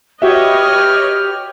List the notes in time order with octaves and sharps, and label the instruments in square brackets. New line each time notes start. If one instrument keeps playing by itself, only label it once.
[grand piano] F#4 E5 [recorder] G4 [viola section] B4 C#5 D#5 [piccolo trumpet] F6